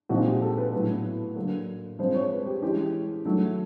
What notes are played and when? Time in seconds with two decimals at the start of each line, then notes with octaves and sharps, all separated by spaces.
0.09 A#2 F3 G#3 C4 D#4 F#4
0.26 G4
0.42 A4
0.57 B4
0.72 A2 F#3 B3
1.36 D3 F#3 A#3
1.99 F3 G#3 C4 C5
2.14 C#5
2.31 B4
2.46 G4
2.62 E3 G#3 C#4 G4
3.25 D#3 F#3 A3